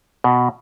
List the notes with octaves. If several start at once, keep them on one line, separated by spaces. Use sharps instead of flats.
B2